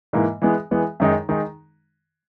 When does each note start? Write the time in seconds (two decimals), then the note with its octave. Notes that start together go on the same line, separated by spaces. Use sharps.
0.13 G#2 E3 A#3
0.42 E3 G#3 B3
0.71 E3 G#3 B3
1.00 F#2 D#3 G#3 D#4
1.29 D#3 G#3 D#4